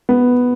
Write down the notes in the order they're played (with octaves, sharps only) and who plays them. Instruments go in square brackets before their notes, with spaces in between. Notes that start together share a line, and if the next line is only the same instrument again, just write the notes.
[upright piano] B3